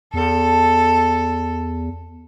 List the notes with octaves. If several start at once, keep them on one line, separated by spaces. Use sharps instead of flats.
E2 A4